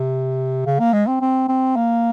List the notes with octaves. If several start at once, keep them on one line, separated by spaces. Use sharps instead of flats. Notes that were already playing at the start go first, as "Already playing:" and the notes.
Already playing: C3
C#3
A#3
G#3
C4
C4
C4
A#3